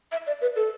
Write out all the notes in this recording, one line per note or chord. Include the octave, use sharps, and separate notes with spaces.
E5
D5
B4
A4